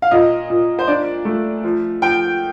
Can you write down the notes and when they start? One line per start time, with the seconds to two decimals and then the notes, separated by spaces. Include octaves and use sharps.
0.02 F5
0.11 A#2 D#5
0.50 A#2
0.79 C5
0.87 D4 D5
1.25 A3
1.64 F3
2.02 F3 G5